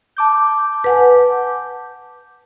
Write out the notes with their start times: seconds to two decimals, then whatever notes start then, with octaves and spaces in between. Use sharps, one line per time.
0.17 A5 D6 G6
0.84 B4 F#5 G#5